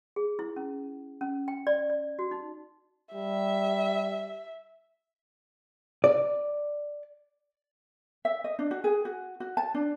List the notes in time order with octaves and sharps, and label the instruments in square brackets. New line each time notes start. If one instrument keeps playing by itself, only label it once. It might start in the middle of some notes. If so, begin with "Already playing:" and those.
[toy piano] G#4
E4
C#4
C#4
G5
D5
D5
F#4
D#4
[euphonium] G3 [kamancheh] E5
[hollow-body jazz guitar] D5
[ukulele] E5
D#5
D4
F#4
G#4
F#4
F#4
A5
D4